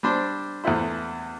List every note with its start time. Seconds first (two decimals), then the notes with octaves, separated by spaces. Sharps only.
0.03 G3 D4 C5
0.64 E2 E3 A3 E4 C5